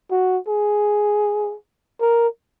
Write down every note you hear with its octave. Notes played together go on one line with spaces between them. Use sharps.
F#4
G#4
A#4